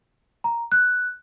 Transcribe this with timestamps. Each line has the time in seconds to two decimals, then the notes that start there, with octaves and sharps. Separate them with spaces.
0.44 A#5
0.72 F#6